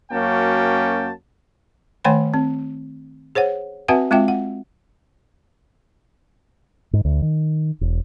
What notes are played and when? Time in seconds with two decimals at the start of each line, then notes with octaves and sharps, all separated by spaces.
0.11 F#2 A#3 C#4 F#4 G5 A5
2.05 D#3 A3 C#5 G5 G#5 B5
2.34 C4
3.35 G#4 C5 C#5 F#5
3.88 C4 F#4 B4 E5 F#5 G#5
4.11 G#3 C4 F4 E5 G5
4.28 F#5
6.93 G#2
7.05 D2
7.22 D#3
7.81 E1